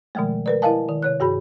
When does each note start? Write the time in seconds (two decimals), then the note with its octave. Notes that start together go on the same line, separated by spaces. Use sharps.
0.15 B2 D#3 F3 G#3 A3
0.46 A#4 B4 D5
0.62 E4 A#4 D#5 F5 G#5 A5
0.89 D#3
1.03 C3 C#5 F#6
1.20 G2 F#4 G#4 B5